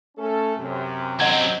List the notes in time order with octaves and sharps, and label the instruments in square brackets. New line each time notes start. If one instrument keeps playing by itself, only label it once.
[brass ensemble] A3 C#4 A4
F#2 C3
[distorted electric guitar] F#3 C4 [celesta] D#5 F#5 G#6